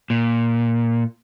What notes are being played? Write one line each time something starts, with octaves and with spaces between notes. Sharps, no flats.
A#2